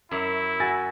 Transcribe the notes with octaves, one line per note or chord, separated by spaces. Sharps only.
F#2 E4
F#4 G#5 E6 A6 A#6